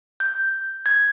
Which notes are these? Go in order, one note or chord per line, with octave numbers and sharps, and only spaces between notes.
G6
G#6